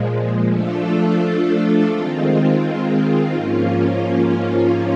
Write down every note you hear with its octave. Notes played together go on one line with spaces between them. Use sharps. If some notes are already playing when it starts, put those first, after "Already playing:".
Already playing: A#2 F3 G#3
F3 A3 D4 F4 A4
D#3 G#3 C4 F4
G#2 F3 A#3 C#4 F4